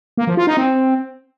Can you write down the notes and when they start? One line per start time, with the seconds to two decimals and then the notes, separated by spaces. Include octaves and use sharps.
0.18 A#3
0.27 F3
0.37 F4
0.47 D#4
0.57 C4